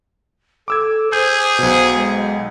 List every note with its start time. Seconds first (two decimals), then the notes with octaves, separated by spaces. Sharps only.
0.68 A4 D6 E6 G#6
1.13 G#4 C5 G6
1.59 B1 B2
1.94 G#3